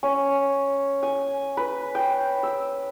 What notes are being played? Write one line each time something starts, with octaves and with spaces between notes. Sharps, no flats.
C#4
G#5
B4
G5
E6